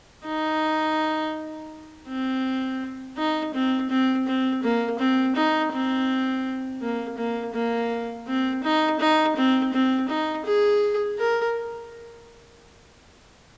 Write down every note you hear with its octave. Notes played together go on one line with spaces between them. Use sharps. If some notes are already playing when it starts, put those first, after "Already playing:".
D#4
C4
D#4
C4
C4
C4
A#3
C4
D#4
C4
A#3
A#3
A#3
C4
D#4
D#4
C4
C4
D#4
G#4
A#4